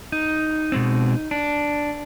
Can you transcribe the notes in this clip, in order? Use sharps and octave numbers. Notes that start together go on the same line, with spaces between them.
D#4
B2 G#3 C4
D4